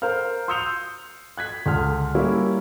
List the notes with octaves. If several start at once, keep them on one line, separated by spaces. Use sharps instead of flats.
A#4 C5 F5 F6
C6 D#6 E6 G6 C#7 F7
F#6 G#6 B6
C#2 D3 G#4 F6
G3 A#3 C#4 E4